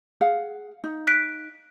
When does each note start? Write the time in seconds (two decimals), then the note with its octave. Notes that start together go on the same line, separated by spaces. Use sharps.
0.21 G#4 F5 F#5
0.84 D#4
1.07 F#6 B6 D7